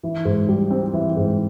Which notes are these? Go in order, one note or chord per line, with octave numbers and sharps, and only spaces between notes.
E3
G#2
G3
C4
E3
G#2